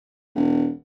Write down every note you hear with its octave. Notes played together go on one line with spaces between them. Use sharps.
E1